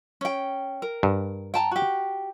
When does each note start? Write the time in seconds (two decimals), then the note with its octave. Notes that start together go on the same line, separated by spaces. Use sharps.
0.21 C#4 G5
0.82 A#4
1.03 G2
1.54 G5 A5 A#5
1.71 F#4 G4